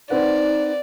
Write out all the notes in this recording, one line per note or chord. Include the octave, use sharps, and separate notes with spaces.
C4 D#4 B4 D5 F#5